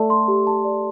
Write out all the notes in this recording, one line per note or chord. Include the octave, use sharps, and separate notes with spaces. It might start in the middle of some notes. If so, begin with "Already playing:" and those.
Already playing: A3 A4 D5 A5
C6
G4
A5
D5